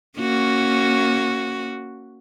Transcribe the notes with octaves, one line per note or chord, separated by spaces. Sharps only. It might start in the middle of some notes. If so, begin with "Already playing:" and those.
A#3 C#4 F#4